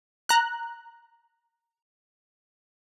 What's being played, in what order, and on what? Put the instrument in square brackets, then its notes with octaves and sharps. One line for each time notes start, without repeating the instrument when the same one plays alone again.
[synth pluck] A#5 F#6